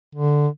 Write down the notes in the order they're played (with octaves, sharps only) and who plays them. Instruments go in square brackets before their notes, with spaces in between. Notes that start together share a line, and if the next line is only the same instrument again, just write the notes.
[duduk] D3